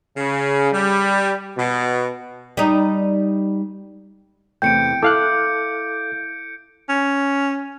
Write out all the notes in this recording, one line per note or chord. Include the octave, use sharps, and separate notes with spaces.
C#3
G3
B2
G3 D#4
E2 C3 A3 G5 G6 C#7 D7
E4 A4 F5 D6 F#6
C#4